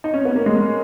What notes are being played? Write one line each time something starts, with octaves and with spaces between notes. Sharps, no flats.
D#4
C#4
B3
A#3
G#3